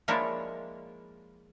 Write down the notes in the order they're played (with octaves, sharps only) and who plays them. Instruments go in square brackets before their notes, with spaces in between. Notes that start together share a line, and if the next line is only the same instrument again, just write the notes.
[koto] F3 G#3 A#3 D4 E4 C#5